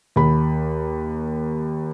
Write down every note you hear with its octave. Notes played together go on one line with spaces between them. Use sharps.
D#2 B5